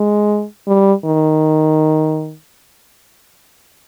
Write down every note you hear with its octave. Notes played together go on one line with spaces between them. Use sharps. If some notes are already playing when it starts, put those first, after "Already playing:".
Already playing: G#3
G3
D#3